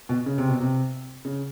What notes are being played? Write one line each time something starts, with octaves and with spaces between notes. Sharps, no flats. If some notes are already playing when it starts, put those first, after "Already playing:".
B2
C#3
C3
B2
C3
C#3